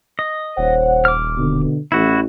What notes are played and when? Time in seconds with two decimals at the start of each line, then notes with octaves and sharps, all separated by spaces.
0.19 D#5
0.58 D#1 C5 C#5 F#5
1.05 D6 F6
1.37 B2 D3
1.92 A1 E4 F#4